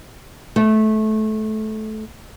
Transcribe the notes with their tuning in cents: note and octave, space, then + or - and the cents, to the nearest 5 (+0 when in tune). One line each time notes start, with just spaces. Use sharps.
A3 -20